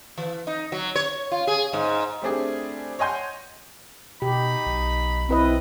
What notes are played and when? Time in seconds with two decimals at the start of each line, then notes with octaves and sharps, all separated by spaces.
0.18 E3
0.47 D#4
0.72 F#3
0.96 C#5
1.32 F4
1.47 G#4
1.73 G#2
2.22 G3 A3 C4 D4 G#4
2.99 C#5 D#5 F#5 G#5 C6 G6
4.22 B2 D#4 G4 B5
4.66 B1
5.29 B1 C4 E4 B4 D#5